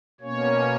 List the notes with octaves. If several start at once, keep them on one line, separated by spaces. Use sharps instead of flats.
B2 A#3 C#4 C#5